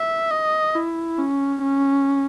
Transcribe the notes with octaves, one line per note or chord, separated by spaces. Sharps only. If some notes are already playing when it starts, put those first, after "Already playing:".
Already playing: E5
D#5
E4
C#4
C#4